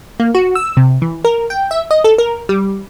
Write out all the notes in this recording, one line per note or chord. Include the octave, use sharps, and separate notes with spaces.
A#3
F#4
E6
C3
E3
A#4
G5
E5
D#5
A4
A#4
G3